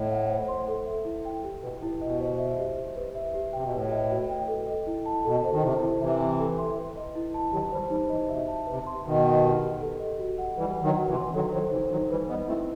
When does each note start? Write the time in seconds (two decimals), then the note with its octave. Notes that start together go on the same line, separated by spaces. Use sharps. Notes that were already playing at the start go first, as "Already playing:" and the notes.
Already playing: A2 D#5
0.11 F#5
0.30 C5
0.48 C6
0.68 A4
0.86 E5
1.05 E4
1.25 G5
1.44 G4
1.63 B2 B4
1.81 A2 E4
2.01 B2 D#5
2.20 C5
2.38 E5
2.58 G4
2.76 G4
2.96 B4
3.15 E5
3.34 G4
3.53 C3 G5
3.63 B2
3.72 A2 B4
3.92 D#5
4.10 F#4
4.29 G5
4.48 A4
4.67 D#5
4.87 E4
5.06 A5
5.25 B2 A4
5.44 C5
5.52 D#3
5.62 C3 E4
5.82 E4
6.00 C3 E3 E5
6.19 G5
6.39 A4
6.58 C6
6.77 B4
6.96 D#5
7.15 E4
7.34 A5
7.52 D#3 F#3 G4
7.71 E3 G3 C5
7.90 E3 G3 D#4
8.10 C3 E3 D#5
8.29 B2 E5
8.48 A5
8.67 C3 B4
8.87 C6
9.05 B2 D#3 B4
9.24 F#5
9.43 G4
9.63 G4
9.81 A4
10.00 D#5
10.19 F#4
10.38 F#5
10.57 E3 G3 B4
10.77 F#5
10.82 D#3 F#3
10.96 F#4
11.08 C3 E3
11.15 C6
11.34 D#3 F#3 A4
11.52 D#3 F#3 C5
11.71 C3 E3 D#4
11.91 D#3 F#3 D#4
12.10 E3 G3 B4
12.29 G3 B3 D#5
12.47 A3 C4 E4